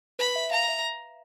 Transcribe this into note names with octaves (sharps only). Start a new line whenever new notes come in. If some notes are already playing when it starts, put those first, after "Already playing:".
B4 B5
E5
F5 A#5
E5